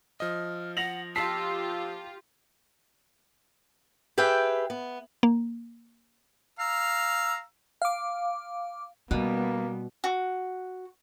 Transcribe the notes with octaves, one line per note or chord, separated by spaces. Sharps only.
F3 D#5 F6
F#5 A#6 F7 F#7
F4 G4 A5 E6 B6 C7
G4 G#4 B4 E5 G5
B3
A#3
F5 A#5 E6
F5 D6
B2 G3 A#3 B3 C#4
F#4